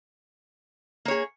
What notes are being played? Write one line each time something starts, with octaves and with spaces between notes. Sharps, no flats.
A#3 G#4 C#5